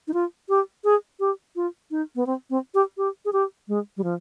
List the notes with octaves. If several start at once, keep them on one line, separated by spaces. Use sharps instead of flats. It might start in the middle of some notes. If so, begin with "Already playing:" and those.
D#4
F4
G4
G#4
G4
F4
D#4
B3
C4
C4
G4
G4
G#4
G4
G#3
G3
F3